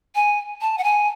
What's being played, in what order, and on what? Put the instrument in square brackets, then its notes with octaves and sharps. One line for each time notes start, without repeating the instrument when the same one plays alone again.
[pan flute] G#5
A5
F#5
G#5